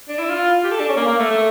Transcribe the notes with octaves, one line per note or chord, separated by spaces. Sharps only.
D4
E4
F4
G4
A4
D4
C#4
A#3
A#3
A3
A3